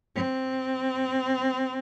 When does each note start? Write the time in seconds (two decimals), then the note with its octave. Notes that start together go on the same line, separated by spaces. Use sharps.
0.15 C4